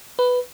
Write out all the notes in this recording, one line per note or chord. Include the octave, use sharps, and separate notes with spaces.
B4